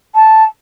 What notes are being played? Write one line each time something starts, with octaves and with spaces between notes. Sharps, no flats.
A5